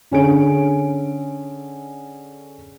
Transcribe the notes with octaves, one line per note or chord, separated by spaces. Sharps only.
D3 C#4 G#4 D7